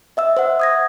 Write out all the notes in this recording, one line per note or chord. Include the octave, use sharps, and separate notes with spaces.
D#5 E5 E6
C5 E5 F#5
D#6 G#6 A#6